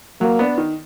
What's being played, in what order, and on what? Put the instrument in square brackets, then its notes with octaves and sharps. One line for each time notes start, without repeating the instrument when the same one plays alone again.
[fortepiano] F#3 [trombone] A#3
[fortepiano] B3 D4
D#3